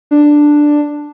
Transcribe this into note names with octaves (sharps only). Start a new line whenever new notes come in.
D4